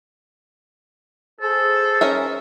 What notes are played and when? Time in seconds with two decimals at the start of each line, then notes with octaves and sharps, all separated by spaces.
1.41 G#4 A4 C5
2.01 C#4 A#4 E5